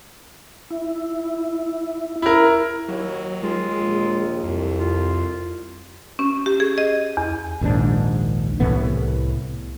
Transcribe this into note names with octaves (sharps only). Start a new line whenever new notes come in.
E4
E4 A#4
D#2 F#3
D#2 G#3 F4
A#1
C2 F2
F4
C#4
G4
G#4
D#5
E2
A#1 D#2 G#2 D4
C2 A2 E3 B3